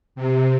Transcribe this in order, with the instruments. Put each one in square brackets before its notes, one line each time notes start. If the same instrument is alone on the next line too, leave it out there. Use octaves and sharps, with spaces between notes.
[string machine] C3